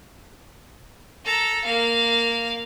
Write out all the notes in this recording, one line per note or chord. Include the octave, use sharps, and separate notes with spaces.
A4 A#5
A#3 F5